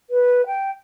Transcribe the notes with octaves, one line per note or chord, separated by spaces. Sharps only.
B4
G5